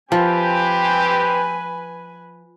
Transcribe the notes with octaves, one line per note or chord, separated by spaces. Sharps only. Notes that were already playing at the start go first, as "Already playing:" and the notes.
F3 C4 G4 B4 G#5